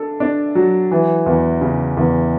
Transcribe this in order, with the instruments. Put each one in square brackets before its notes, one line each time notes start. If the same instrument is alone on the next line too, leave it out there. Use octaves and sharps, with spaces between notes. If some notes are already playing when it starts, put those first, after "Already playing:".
Already playing: [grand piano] D4 A4
D4
F#3
E3
E2
C#3
E2